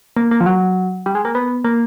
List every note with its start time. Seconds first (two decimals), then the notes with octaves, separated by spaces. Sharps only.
0.17 A#3
0.31 A#3
0.41 F3
0.46 F#3
1.06 G3
1.15 G#3
1.25 A#3
1.35 B3
1.64 A#3